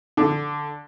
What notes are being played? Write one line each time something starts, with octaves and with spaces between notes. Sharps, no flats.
D3